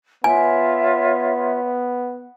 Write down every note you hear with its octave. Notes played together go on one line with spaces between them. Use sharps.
B3 F4 C#5 E5 G#5